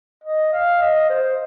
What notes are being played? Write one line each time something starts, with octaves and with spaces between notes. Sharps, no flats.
D#5
F5
D#5
C5